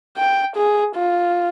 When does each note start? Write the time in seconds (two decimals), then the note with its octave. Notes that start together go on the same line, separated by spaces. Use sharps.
0.18 G5
0.57 G#4
0.96 F4